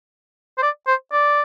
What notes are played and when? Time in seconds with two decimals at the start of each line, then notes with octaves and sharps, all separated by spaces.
0.58 C5
0.62 D5
0.87 C5
1.12 D5